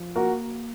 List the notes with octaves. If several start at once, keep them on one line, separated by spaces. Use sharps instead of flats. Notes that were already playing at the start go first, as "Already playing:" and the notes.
Already playing: F3
A#3 F#4 A#4